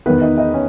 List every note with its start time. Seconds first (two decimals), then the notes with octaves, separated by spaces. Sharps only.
0.06 E2 D#3 B3 B4
0.21 D#4 D#5
0.38 D#4 D#5
0.54 C#4